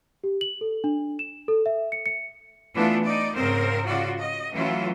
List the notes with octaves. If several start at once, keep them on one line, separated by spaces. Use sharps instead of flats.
G4
F#7
A4
D4
E7
A4
E5
C#7
C#7
E3 A3 B3 D4 F4
D#4 D5
G#2 C#3 C4 A#4 C5
C#3 F4 F#4 D5
D#5
E3 F#3 A3 C#4 E4 F4